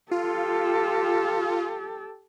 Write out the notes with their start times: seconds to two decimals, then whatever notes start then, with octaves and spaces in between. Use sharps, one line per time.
0.11 F4 G4 A4